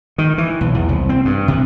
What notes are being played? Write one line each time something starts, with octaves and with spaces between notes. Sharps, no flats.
D#3
E3
B1
E2
C2
C4
G2
C3